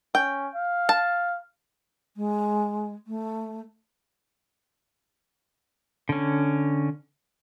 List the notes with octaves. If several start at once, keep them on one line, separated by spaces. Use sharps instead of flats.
C#4 G5
F5
A5
G#3
A3
D3 C#4